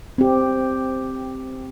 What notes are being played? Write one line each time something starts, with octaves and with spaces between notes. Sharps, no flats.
C4 G4